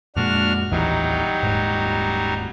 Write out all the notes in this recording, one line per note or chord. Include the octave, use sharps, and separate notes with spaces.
F2 A#2 G#3 D4 F#4 F6
A1 D#2 E3 F#3 G3 D#4
D#1 G#2